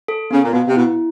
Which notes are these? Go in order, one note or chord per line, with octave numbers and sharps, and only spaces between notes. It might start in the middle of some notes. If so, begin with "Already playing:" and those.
A4
C#3 B3
A#2
B2 B3
C3
B2 E4